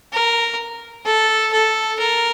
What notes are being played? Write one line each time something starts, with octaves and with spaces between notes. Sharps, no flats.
A#4
A4
A4
A#4